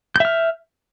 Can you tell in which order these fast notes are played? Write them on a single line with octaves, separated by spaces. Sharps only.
G6 E5 F6